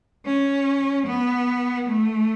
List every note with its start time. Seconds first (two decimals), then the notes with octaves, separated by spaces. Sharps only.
0.26 C#4
1.06 B3
1.88 A3